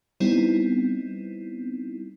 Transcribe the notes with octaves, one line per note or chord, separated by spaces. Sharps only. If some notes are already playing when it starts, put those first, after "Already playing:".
G3 B3 C4 D#4 E4